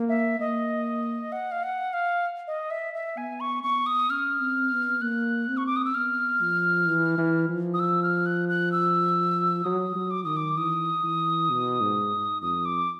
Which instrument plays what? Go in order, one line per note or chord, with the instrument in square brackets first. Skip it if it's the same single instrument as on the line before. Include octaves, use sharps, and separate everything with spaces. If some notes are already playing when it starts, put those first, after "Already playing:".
Already playing: [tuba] A#3
[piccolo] E5
[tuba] A#3 [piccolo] D#5
[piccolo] F#5
F5
F#5
F5
D#5
E5
E5
[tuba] B3 [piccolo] G#5
[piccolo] C#6
[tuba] B3 [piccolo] C#6
[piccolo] D#6
[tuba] C#4 [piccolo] F6
[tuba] C4
B3
[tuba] A#3 [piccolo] F#6
[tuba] C4
[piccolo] C#6
D6
D#6
E6
[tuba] B3 [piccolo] F6
[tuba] F3
E3
E3
F3
[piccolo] D#6
E6
F6
F#6
F#6
E6
[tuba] F#3 [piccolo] D#6
[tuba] F#3
[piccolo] D6
[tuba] D#3 [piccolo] D#6
[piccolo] D6
[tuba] E3 [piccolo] D#6
[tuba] E3
B2
G#2
[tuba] F2 [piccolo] D#6
[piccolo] D6